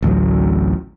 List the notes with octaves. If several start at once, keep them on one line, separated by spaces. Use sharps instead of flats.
A1 D2 A2 F#3